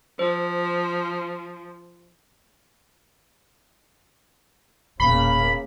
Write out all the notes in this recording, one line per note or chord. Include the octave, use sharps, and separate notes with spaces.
F3 C5
E1 A#2 C#3 A#3 B5